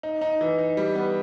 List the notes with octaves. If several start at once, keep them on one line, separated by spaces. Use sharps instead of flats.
D#4
D#4
E3
D#4
G3
B3